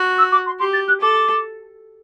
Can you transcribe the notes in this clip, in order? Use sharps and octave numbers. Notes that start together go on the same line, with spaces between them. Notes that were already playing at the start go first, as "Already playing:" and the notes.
Already playing: F#4
E6
D6
C6
G4 C6
A6
F#6
A4 D6